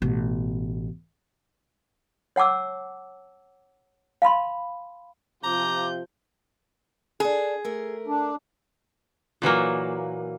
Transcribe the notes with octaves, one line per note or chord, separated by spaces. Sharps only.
A1 B2
C#5 F#5 A5 D6 E6
F5 A5 B5 C6
C3 F3 F4 A#5 D6 G6
D4 G#4 A4
A3 A#4
D4
A#2 E3 F#3 A#3